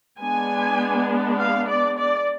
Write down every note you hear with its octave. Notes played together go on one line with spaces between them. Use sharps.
G#3 B3 D4 G#5
F5
D5
D5